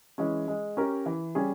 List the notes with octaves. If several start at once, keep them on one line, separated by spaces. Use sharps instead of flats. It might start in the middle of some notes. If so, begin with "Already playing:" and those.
E3 G#3 C#4
G#3
C#4 G4 A#4
E3
G3 C#4 G#4